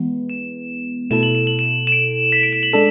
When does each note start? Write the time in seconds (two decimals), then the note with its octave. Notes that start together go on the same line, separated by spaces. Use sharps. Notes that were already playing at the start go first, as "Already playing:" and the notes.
Already playing: E3 G#3 B3
0.29 E7
1.11 B2 A3 E4 A4 E7
1.23 F#7
1.35 E7
1.47 F#7
1.59 E7
1.87 E7
1.92 D7
2.32 B6
2.43 D7
2.53 E7
2.63 F#7
2.73 G#3 D4 A4 E7